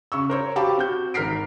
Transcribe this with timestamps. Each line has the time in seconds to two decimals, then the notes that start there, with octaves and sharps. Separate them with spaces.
0.12 C#3 C#6 E6
0.30 A#4 C5 C#5
0.56 F#4 G4 F5 A5 B5 D6
0.77 C4 F#4 G6
1.14 G#1 A#4 F6 B6 C7 D7